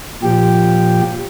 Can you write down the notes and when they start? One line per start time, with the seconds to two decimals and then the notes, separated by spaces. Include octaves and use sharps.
0.23 A#2 F3 G4